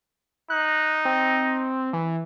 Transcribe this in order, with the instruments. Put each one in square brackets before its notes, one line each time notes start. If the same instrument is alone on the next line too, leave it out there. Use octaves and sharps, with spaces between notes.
[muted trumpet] D#4 [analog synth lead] F#6
[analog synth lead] C4
E3